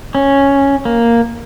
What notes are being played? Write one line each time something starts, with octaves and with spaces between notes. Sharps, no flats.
C#4
A#3